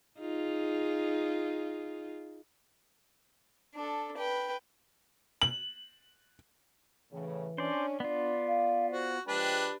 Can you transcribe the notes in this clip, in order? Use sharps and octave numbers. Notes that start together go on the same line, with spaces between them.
D#4 F4 G#4
D4 A4
B4 G5
F#7
A2 C#3 E3
C#4 D4 C5 D5
B3 D4 F4 D5
F5
F#4 C5
F3 G#3 D4 G4 B4 G5